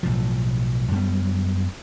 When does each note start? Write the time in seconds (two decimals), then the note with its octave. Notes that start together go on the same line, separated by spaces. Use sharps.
0.03 B1 A2 F3
0.91 F#2 G3 B3